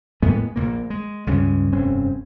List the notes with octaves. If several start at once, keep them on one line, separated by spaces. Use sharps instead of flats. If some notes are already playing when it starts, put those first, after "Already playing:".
A2 G#3 A#3 B3
A#1 A#2 A#3
G#3
C#2 G2 G#3 C#4
F1 G2 C4 C#4